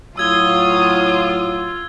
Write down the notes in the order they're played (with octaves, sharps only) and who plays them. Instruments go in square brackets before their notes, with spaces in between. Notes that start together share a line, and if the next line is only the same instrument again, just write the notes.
[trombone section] A2 F#3 [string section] F4 [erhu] D#6 [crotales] E6 G#6 G7